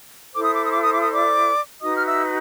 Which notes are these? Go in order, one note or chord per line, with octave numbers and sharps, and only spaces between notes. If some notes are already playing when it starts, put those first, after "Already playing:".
E4 A4 C5 D6
D#6
D6
D#6
D6
D#6
D6
D#6
D5 D6
D#4 F#4 B4 D#5 D#6
F6
E5 E6